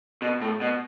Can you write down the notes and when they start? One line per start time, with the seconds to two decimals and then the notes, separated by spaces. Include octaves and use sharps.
0.22 B2
0.42 A2
0.61 B2